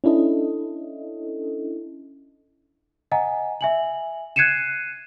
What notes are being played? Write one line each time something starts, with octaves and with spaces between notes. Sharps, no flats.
C#4 D4 E4 A4 D#5
D#5 F#5 G#5 A#5
E5 G#5 F#7
F#6 G#6 C7 C#7 D#7 E7